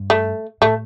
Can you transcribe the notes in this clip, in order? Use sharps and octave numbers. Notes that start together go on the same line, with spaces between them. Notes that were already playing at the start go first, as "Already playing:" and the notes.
Already playing: G2
A3
A2 A3